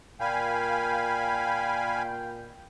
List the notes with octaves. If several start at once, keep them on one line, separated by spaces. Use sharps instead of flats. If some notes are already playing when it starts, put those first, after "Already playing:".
A#2 F5 G5 G#5 B5